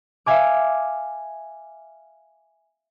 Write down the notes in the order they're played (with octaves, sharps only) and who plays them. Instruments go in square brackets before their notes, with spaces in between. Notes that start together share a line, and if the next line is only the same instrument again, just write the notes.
[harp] E5 F5 G#5 D6